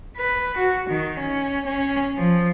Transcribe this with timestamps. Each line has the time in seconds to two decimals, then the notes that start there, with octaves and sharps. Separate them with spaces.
0.17 B4
0.57 F#4
0.89 D#3
1.19 C#4
1.66 C#4
2.17 F3